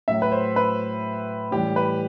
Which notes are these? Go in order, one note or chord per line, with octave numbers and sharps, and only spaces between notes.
A2 F#3 E5
B4
C5
B4
A2 E3 G3 G4
B4